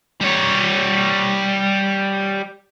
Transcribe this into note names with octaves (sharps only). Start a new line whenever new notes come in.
G3 C#5